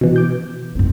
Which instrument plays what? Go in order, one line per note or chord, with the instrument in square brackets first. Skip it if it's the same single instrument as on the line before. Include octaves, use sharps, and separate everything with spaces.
[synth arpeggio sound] B2 E3
D6 G6
[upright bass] F#2 C4